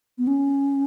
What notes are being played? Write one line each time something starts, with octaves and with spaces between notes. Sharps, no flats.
B3
C#4